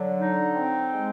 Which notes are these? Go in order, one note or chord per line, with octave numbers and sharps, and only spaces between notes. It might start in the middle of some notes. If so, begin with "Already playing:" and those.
Already playing: D3 F#3
D#4
C4
G#3